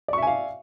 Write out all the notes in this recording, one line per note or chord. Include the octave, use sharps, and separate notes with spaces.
D5 E5 F5 G#5 C#6